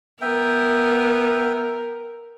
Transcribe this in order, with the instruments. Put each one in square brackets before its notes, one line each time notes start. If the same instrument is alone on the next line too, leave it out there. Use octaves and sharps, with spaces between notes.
[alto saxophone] B3 [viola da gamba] A#4 [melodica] E5 G5